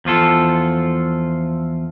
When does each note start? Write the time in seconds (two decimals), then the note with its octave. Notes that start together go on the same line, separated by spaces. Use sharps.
0.05 E2 F3 F4 A4